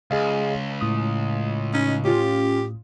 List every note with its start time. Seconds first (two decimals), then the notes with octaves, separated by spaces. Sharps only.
0.11 C#2 G#4 D#5 F5
0.81 A2 D#6
1.74 C#4 D#4
2.05 C#4 F4 G4